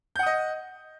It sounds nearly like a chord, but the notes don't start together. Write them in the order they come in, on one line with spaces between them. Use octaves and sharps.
G6 F#5 D#6 D#5